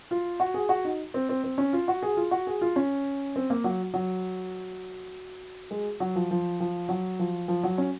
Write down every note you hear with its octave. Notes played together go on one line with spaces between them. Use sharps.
F4
F#4
G#4
F#4
D#4
C4
C4
C4
C#4
F4
F#4
G#4
F4
F#4
G#4
F4
C#4
C4
A#3
F#3
F#3
G#3
F#3
F3
F3
F3
F#3
F3
F3
F#3
C#4